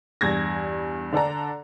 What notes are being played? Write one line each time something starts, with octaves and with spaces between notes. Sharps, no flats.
E2 G2 G#6 A#6
D3 D4 A4 A#5